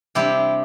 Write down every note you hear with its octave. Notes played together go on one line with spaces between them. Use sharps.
C3 G3 D4 E4 G4